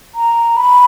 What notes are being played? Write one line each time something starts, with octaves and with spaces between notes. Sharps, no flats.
A#5
B5